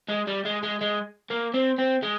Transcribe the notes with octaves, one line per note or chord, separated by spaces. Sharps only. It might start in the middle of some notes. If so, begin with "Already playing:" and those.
G#3
G3
G#3
G#3
G#3
A#3
C4
C4
G#3